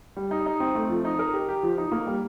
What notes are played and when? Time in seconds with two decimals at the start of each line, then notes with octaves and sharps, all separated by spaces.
0.16 G3
0.31 D#4
0.46 D#4
0.60 C4
0.75 A3
0.89 F3
1.05 D#4
1.19 A#4
1.33 G4
1.49 G4
1.63 F3
1.78 D#4
1.92 A#3
2.07 G3